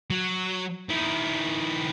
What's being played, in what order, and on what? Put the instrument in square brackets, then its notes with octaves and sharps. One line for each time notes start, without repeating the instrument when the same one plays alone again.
[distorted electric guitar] F#3
D#3 E4